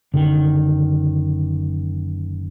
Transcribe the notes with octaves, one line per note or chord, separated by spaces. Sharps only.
F#1 D3 D#3